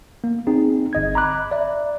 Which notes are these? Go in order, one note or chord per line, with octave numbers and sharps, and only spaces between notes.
A#3
C4 D#4 G#4
G1 D#5 G#6
A#5 B5 D6 F#6
D5 E5